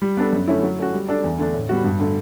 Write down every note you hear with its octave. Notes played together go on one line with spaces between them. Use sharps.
G3
B3 D4 A4
F#2
D3 A3 C#4 E4
F#3
A3 C#4 F#4
G3
D4 A4 D5
E2
D3 A3 D4
A2
G3 B3 F#4
G2
D3 A3